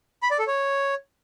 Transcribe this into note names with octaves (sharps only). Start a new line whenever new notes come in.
B5
D5
A4
C#5